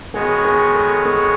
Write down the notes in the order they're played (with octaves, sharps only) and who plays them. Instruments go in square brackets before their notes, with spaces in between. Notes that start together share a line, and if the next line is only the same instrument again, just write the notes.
[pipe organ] D#3 G#3 B3 F#4 C#5 [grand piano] G#4
[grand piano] G#4
A4
G#4